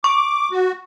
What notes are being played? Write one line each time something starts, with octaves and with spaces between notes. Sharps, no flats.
C#6 D6
F#4